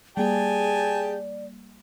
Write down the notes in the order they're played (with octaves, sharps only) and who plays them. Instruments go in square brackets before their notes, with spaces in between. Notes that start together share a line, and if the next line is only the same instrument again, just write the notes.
[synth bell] G3 A#3 [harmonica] G4 G#5 A5 [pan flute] G#4 [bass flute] D5